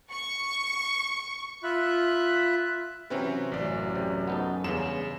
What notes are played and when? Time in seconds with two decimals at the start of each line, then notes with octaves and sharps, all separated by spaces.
0.12 C#6
1.63 F4 E5 B5 F#6
3.10 C3 E3 F#3 C4 C#4 B4
3.52 A1 F#2 D5
3.95 C3
4.27 B3 D#4 A4
4.64 E2 G2 C#3 E7